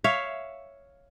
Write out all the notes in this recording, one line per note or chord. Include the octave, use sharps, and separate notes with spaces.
C#5 E5 F5